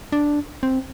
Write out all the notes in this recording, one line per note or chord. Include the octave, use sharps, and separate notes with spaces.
D4
C4